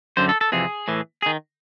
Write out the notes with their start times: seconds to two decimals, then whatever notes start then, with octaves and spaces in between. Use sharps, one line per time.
0.17 F#2 D3 C5
0.29 A4
0.41 A4
0.52 F2 C3 E3 G#4
0.88 A2 E3
1.22 G#4
1.26 D#3